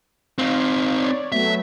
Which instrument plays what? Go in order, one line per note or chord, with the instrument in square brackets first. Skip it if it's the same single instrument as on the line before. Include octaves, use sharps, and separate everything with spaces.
[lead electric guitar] C4 D#4 [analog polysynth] F5
[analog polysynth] C#5 D5
[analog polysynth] F#3 A3 B3 [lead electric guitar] E5